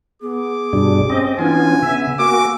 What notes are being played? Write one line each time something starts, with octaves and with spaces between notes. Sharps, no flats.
B3 G#4 D6
G2 B2 G3 D4
C4 C#4 D#5
E3 B3 C#4 D4 F4 G#5
C#3 B3 E5 E6
A#3 F#4 G#5 D6